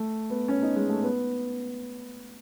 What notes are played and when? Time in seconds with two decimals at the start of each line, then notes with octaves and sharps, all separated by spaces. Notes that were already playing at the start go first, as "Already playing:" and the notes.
Already playing: A3
0.30 B3
0.48 C#4
0.62 D#4
0.76 G#3
0.90 A3
1.03 B3